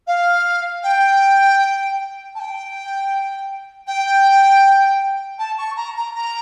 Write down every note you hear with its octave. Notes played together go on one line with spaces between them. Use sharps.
F5
G5
A5
G5
G5
A5
C#6
A#5
A#5
A#5